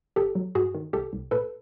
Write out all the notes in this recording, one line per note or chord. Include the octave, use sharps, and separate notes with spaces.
G1 G4 A4
F#3
G2 F#4 G#4
D#3
C2 G4 A4
C2
A#2 A4 B4